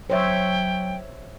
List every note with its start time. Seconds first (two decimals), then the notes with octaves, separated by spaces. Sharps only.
0.10 F#3 C5 C#5 E5 G5